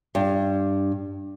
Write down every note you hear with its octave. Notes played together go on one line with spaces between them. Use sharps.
G2